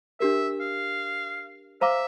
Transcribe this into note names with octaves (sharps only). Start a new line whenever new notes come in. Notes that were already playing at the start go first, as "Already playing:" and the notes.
D4 G4 A#4 E5
F5
C5 E5 F5 A#5 D6